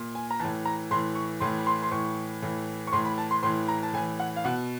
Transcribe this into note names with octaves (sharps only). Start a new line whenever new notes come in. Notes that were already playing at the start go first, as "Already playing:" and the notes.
Already playing: A#2
G#5
A#5
A2 E3 A5
A#5
A2 E3 C6
C#6
A2 E3 C6
B5
C6
C6
A2 E3 C#6
A2 E3
C#6
A2 E3 C6
B5
A5
C6
A2 E3 C6
A#5
A5
A2 E3 G#5
F#5
F5
B2 F#5